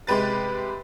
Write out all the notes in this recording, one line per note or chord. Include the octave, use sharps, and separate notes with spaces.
C3 G#3 G4 B4 A6